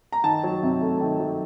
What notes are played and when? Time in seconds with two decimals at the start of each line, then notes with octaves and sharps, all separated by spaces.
0.12 A#5
0.24 D#3 A5
0.44 F#3
0.63 C3
0.81 A3
1.01 D#3
1.20 F#3